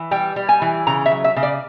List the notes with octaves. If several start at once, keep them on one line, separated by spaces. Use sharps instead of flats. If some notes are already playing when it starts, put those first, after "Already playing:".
Already playing: E3
G3 G5
G3
G#5
E3
C#3 A#5
E5
F#3
E5
C#3
D5